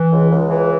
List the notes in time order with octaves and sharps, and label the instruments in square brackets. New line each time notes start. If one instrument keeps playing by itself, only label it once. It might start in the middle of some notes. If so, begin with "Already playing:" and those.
Already playing: [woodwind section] E3
C#2
C#2
E3